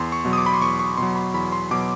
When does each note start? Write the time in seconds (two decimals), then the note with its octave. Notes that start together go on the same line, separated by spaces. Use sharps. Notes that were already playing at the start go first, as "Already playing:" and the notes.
Already playing: E2 C6
0.12 C#6
0.25 B2 F#3
0.33 D#6
0.38 D6
0.46 B5
0.53 C6
0.61 E2 C#6
0.79 C#6
0.97 B2 F#3 C6
1.16 B5
1.34 E2 B5
1.52 C6
1.71 B2 F#3 D6